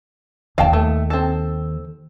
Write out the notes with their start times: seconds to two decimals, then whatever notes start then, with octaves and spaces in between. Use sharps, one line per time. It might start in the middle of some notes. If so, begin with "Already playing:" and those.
0.58 D#2 D#3 F5 G5 A5
0.73 A3
1.10 C4 A4